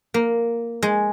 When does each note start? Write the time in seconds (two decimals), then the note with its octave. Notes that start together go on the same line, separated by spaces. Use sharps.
0.14 A#3
0.83 G#3